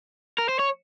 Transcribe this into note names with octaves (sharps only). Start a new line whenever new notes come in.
A#4
C5
C#5